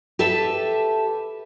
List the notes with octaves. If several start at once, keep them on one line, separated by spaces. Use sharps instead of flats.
G4 A4 B4 E5 A5